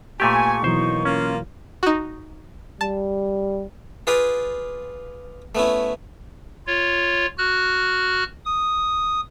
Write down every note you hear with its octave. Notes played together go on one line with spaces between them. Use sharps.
A#2 A3 B3 G4 A4 G#5 C#6
B2 D#3 E3 F#3 A#3 D#4 C5
A#3 C#4 F4
D#4 F#4
G3 A5
F4 G#4 B4 D5 F5
A3 B3 C#4 E4
F4 C#5
F#4 F6 F#6
D#6